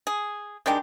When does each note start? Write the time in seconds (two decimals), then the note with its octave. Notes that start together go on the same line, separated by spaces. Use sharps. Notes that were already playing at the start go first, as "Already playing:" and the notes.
0.07 G#4
0.66 D#3 G#3 D4 G4